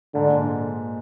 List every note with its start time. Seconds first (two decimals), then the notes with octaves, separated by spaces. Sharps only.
0.14 G#2 D3
0.28 A#2